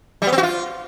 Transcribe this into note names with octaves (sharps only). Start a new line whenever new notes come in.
G3
B3
C4
F#4
F4